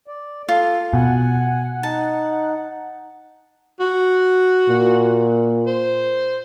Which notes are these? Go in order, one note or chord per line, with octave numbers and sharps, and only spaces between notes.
D5
F4 A4
B2 F#5 G#5
D#4 A5
F#4
A#2
C5